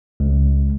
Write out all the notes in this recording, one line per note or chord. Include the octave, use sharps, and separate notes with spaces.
C#2